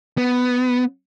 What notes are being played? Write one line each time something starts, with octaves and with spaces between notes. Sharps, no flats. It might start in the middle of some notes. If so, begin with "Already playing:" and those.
B3